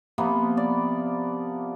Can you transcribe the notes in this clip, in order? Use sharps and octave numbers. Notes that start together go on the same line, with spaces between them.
C3 F3 A#3 B3
D5